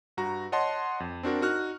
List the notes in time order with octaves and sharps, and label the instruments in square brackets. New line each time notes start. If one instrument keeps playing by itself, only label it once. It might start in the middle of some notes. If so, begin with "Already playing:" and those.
[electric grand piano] G2 F#4 A#5
C#5 D#5 F#5 A5 C6
F2
C4 D4 F#4 A#4
D#4 F#4 F6 F#6